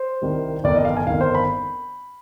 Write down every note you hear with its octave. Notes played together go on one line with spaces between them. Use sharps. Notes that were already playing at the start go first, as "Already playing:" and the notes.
Already playing: C5
C2 C3 D#3 G3
G1 F2 D#3 D5
D#5
F5
G#5
G1 F2 D#3 F5
C5
B5